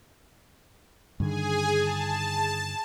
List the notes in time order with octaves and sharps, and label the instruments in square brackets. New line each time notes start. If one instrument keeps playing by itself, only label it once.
[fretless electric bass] G2 D3 D#3 [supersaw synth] G#4 G#5
[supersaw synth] A5